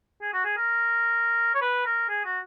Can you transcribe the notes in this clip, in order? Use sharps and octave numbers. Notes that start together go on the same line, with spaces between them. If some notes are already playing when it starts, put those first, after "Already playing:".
G#4
F#4
G#4
A#4
C#5
B4
A#4
G#4
F#4